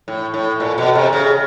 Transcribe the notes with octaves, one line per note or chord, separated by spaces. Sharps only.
A2
A2
A#2
B2
C3
C#3